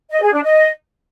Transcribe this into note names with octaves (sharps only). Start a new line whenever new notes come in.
D#5
G#4
D4
D#5